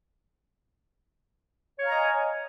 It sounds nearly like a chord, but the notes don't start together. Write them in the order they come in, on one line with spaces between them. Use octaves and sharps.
C#5 F5 A#5 D#5 G#5